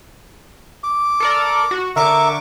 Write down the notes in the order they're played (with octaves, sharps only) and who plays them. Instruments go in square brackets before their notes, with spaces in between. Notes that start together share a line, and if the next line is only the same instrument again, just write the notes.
[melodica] D6
[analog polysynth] A4 A#4 D5
F#4
[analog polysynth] D3 C#6 D6 [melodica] A#4 E5